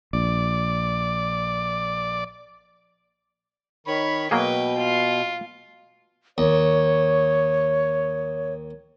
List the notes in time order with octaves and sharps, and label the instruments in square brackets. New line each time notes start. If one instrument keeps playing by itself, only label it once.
[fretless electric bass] A#1 [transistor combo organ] D5
[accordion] D#3 B5 [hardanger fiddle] C#5
[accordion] B2 [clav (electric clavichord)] F#3 A#3 G#4 [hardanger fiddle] B4 G5
[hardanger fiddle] F4
[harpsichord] D#2 [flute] C#5